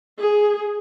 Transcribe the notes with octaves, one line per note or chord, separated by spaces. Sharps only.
G#4